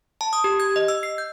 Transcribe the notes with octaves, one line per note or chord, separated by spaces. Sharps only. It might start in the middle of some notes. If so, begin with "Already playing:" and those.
A5
D#6
G4
G#6
D#5
E6
C7
G6